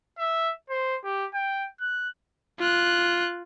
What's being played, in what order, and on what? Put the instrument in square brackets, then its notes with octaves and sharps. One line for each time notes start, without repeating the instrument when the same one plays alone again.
[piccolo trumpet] E5
C5
G4
G5
F#6
[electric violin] F4 F#6